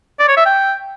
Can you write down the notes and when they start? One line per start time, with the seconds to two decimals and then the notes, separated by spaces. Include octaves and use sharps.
0.19 D5
0.28 C#5
0.37 E5
0.46 G5